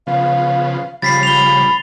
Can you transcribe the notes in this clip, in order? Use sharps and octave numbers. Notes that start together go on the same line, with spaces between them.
C#3 F3 B3 F5
C#3 F3 G3 B5 A6 B6 C7
B5 F7 G7